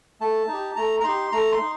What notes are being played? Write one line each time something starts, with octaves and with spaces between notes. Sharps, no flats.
A3 A5
D#4
G4
A3 A#5
A#5
D#4 G4 C6
A3 A#5
C6
D#4